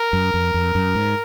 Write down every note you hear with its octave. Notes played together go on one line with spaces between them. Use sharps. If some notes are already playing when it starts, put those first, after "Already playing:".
Already playing: A#4
F#2
F2
F2
F#2
G#2